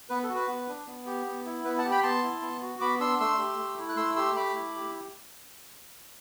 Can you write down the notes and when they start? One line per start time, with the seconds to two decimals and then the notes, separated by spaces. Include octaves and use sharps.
0.10 B3 B4
0.23 A4
0.29 F#4
0.35 B4
0.48 B3
0.69 D4
0.87 B3
1.06 G4
1.27 B3
1.46 E4
1.64 B3 B4
1.78 F#5 A5
1.85 G4
1.91 G5 B5
2.03 B3 A5 C6
2.23 E4
2.42 B3
2.62 F#4
2.81 B3 B5 D6
3.00 D4 C6 E6
3.20 A3 C6 E6
3.38 G4
3.58 A3
3.78 E4
3.89 F#6
3.97 A3 C6 E6
4.16 G4 C6 E6
4.35 A3 B5 D6
4.55 E4
4.75 G4